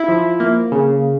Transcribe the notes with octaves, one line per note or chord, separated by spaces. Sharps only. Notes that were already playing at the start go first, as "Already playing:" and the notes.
Already playing: E4
F3
A#3
C#3